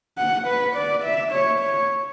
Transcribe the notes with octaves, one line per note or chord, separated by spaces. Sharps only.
F#5
B4
D5
E5
C#5
C#5